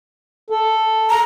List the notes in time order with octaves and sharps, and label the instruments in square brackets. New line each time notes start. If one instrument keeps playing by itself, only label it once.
[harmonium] A4
[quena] A#5